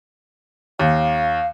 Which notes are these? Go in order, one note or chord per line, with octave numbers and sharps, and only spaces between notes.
D#2 F5